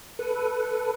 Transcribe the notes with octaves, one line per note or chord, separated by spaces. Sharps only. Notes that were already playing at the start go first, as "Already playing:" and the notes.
A4 B4